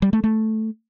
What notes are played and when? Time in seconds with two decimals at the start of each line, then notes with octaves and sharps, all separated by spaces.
0.02 G3
0.13 A3
0.24 A3